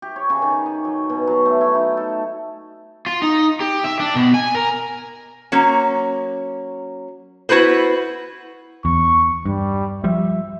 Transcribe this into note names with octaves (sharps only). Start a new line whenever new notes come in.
G4
C#5
C#3
D#3
G#4
F#3
B2
F#3
A3
E4
D#4
A4
F4
D#4
G4
E5
D4
B2
G#5
A#4
F#3 A#3 C#4
B3 E4 F#4 B4 C5
E2 C#6
G2 G3
F3 G3 E5